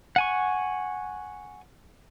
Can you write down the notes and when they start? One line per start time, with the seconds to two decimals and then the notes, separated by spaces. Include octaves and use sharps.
0.16 F#5 G#5 C#6